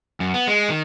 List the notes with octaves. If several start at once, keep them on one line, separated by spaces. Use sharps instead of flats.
F#2
B3
G#3
D#3